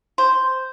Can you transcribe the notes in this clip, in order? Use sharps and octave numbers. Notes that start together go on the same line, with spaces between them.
C5